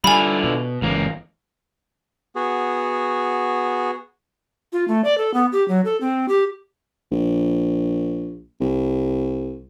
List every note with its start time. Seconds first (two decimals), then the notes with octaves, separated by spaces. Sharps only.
0.04 D3 G3 E4 F4 G#5 B5
0.44 B2
0.82 G1 C#2 E3 A#3
2.36 B3 F#4 G#4
4.73 F4
4.88 A3
5.04 D5
5.18 A4
5.34 B3
5.53 G4
5.68 F#3
5.85 A4
6.01 C4
6.29 G4
7.12 A#1
8.61 C2